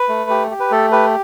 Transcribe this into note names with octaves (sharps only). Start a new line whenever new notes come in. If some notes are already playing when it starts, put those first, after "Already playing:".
Already playing: B4
A3
G4
G4
B4
A3 A4
G4 B4